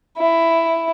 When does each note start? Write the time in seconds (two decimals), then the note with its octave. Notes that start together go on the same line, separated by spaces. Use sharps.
0.18 E4